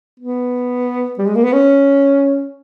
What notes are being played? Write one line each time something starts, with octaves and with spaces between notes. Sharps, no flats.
B3
G3
G#3
A#3
B3
C#4